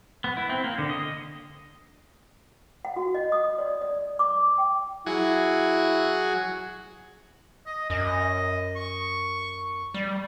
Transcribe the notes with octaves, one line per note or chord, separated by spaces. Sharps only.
B3
E4
C4
A#3
D3
D#5
F#5
F#4
D#5
D#6
D5
D5
D6
G5
F#3 E4 F#4 G#4
D#5
F#2 D#5
C#6
G3